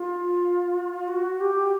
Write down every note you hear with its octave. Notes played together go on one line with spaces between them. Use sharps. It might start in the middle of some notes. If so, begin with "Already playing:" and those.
Already playing: F4
F#4
G4